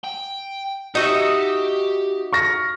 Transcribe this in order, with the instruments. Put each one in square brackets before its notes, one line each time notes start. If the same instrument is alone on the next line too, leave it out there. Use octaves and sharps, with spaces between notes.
[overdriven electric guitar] G5
[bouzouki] D#4 F#4 E5 [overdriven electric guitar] G4
[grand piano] C#6 F6 A#6